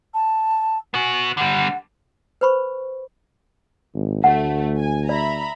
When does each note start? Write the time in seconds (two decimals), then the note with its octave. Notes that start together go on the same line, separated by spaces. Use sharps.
0.14 A5
0.94 B3 F#4 G#5
1.37 D3 G3 F#5
2.41 B4 C5 B5 C#6
3.94 G#1
4.24 D2 A3 F#5
4.78 G#5
5.09 D5 E5 A#5 B5